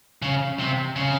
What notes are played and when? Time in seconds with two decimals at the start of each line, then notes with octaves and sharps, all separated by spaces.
0.22 C#3
0.59 C3
0.96 C#3